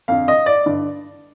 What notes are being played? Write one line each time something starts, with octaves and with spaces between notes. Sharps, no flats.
F2 D3 F5
D#5
D5
G2 D3